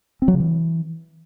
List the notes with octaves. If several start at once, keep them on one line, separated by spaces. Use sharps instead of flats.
C4
F#3
C#3
E3